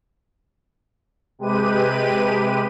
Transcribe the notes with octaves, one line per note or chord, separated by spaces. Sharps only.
C3 G#3 G4 B4 D#7